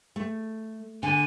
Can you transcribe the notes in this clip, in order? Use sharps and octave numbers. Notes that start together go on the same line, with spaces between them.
A3
D3 G#5